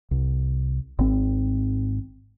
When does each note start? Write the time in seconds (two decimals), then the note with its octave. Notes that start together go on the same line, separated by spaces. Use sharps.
0.11 C2
0.99 G#1 C4